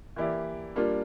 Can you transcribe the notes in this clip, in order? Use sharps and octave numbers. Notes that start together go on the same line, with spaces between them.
E3 A#3 E4 G4 D5
G3 A#3 D4 F4